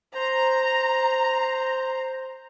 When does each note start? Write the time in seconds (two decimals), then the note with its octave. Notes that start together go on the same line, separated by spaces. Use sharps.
0.15 C5 A#5